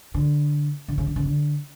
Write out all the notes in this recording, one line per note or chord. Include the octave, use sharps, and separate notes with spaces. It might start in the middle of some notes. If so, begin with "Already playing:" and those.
D3
D3
C#3
D3
C#3
D3